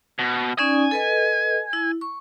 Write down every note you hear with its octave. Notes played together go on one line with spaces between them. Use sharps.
B2
C#4 D#4 D5 G#5
A4 B4 D#5
E4
C#6